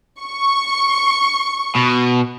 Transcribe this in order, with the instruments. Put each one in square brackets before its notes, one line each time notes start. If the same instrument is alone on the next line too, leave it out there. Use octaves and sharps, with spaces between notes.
[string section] C#6
[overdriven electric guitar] B2